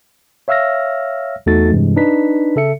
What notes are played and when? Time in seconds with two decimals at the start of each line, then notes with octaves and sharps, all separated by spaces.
0.48 C#5 E5 F5 E6 F6 A#6
1.46 E2 A3 D#4 F#4 A4 A6
1.71 G2 C3 E3 G#3
1.96 D4 D#4 B4 B6
2.56 C#3 A4 E5 C#7